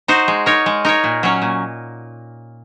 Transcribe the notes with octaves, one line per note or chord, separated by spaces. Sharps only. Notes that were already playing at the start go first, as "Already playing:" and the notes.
D#4 F#4 C5
G#3
D#4 A#4 C#5
G#3
D#4 A#4 C#5
A#2
F#3 C#4
A#2